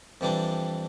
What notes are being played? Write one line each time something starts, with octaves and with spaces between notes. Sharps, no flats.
F2 E3 G3 D4